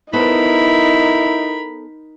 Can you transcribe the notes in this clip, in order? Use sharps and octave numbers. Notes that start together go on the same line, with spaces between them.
B3 D#4 E4 A4 A#4 C5 B5